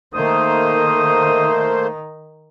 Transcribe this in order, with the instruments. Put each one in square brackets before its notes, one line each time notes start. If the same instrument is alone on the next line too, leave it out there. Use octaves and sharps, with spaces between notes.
[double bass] D#3 D#4 [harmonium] A3 A#3 C5 [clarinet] D#6